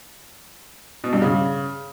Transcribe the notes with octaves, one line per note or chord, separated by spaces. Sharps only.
B2
G2
C#3